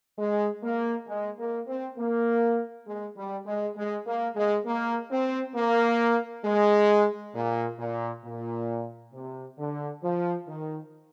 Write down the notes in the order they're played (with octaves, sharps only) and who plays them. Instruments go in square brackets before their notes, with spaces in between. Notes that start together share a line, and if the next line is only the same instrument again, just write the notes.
[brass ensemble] G#3
A#3
G#3
A#3
C4
A#3
G#3
G3
G#3
G#3
A#3
G#3
A#3
C4
A#3
G#3
A#2
A#2
A#2
C3
D3
F3
D#3